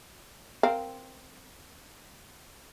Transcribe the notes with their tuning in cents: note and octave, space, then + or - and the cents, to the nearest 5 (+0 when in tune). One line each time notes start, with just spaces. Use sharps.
C4 +0 A#4 +0 F5 +0